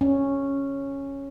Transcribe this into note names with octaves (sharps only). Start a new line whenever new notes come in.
C#4